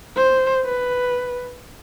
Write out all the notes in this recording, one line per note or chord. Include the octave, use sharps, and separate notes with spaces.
C5
B4